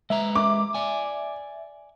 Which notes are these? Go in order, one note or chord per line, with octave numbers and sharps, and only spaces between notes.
G#3 B4 E5 A#5
D6
D5 G#5